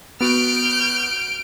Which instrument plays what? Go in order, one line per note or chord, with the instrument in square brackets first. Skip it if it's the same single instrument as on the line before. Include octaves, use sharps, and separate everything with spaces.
[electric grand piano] B3 F#4 [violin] F6 G6 [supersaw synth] D7